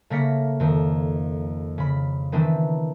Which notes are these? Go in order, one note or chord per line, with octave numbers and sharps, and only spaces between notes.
C#3 A3 A#3 A#6 B6 C#7
F2 D#3
C#3 B5
D#3 E3 B3 C4 D4